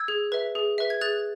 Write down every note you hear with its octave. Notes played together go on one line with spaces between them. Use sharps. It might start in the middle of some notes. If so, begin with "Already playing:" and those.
Already playing: E6 G#6
G#4
B4 E5
G#4
B4 E5
G#6
G#4 F#6 A6